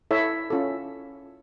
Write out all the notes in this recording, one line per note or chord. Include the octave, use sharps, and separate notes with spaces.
E4 A4 C#5 E5
C#4 F4 A4